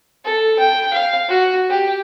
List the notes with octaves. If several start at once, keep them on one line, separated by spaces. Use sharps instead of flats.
A4
G5
F5
F#4
G4